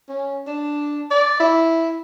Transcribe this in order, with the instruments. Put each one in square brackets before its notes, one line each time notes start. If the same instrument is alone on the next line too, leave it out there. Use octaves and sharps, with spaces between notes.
[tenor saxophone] C#4
D4
D5
E4